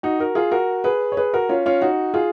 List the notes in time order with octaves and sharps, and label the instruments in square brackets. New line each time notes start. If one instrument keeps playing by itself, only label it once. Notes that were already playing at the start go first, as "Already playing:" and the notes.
[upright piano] D#4 F#4
F#4 A#4
F4 G#4
F#4 A#4
G#4 B4
C#5
G#4 B4
F#4 A#4
C#4 F4
C#4 F4
D#4 F#4
F4 G#4